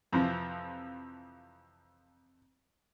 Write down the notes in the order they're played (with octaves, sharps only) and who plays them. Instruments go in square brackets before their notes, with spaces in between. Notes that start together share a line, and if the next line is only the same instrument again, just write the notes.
[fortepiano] F2 C3 E3 F3